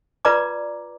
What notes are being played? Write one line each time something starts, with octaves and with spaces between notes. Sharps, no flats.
F4 B4 D5 A#5 D6